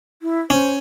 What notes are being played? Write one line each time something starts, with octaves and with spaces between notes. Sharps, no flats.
E4
C#4 C5